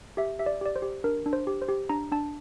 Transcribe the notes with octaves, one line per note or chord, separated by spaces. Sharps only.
G4 E5
G4 E5
D5
G4 D5
C5
G4
D4 A#4
D4
C5
G4
C5
G4
D4 A#5
D4 A5